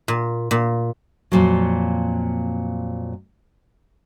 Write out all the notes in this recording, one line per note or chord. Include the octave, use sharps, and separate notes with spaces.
A#2
A#2
F2 A#2 F#3